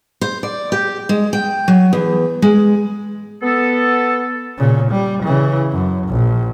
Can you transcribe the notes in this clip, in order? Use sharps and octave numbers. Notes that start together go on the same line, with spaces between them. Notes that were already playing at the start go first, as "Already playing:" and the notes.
C5
D5
G4
G#3
G5
F#3
E2
G#3
B3 A4
A#2 C#3
G3
C#3 E3
F#2
A#1